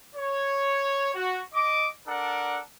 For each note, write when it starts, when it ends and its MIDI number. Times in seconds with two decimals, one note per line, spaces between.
0.15 1.13 73
1.14 1.40 66
1.53 1.87 75
1.53 1.87 86
2.07 2.60 62
2.07 2.60 69
2.07 2.60 70
2.07 2.60 74
2.07 2.60 78